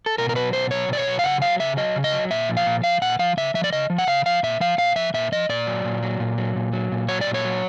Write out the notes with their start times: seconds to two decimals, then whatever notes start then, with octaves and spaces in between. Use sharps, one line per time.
0.06 A4
0.18 B2 A#4
0.29 A#4
0.35 F#3 B4
0.53 B2 C5
0.71 F#3 C#5
0.88 B2 D5
0.97 C#5
1.07 F#3
1.19 F5
1.24 C#3 F#5
1.42 F#3 F5
1.60 C#3 E5
1.77 F#3 D#5
1.96 C#3
2.04 D#5
2.13 F#3
2.31 A#2 E5
2.49 F3
2.57 F5
2.66 A#2
2.84 F3 F5
3.02 A#2 F#5
3.19 F3 F5
3.37 C#3 E5
3.54 F3 E5
3.64 D5
3.73 C#3 D#5
3.90 F3
3.98 F#5
4.07 C#3 F5
4.26 F3 F5
4.43 A#2 E5
4.60 F3 F5
4.78 A#2 F5
4.96 F3 E5
5.14 A#2 E5
5.32 F3 D#5
5.49 A#2 D5
5.67 F#3
5.84 A#2
6.03 F#3
6.20 A#2
6.38 F#3
6.56 A#2
6.73 F#3
6.92 A#2
7.09 F#3 C#5
7.21 D5
7.27 A#2
7.34 C#5
7.45 F#3